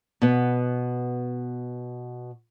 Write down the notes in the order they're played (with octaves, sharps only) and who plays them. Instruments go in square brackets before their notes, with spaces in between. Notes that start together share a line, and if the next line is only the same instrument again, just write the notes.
[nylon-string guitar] B2 B3